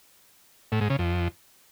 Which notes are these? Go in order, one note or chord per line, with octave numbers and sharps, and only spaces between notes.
A2
G#2
C#3
F2